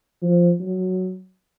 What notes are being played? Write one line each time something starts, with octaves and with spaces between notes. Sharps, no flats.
F3
F#3